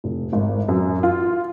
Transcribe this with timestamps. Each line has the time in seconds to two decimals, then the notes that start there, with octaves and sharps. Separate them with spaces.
0.04 F1
0.33 G#1
0.68 F#2
1.03 F4